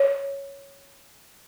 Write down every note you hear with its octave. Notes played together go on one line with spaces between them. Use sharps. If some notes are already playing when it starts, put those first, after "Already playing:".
Already playing: C#5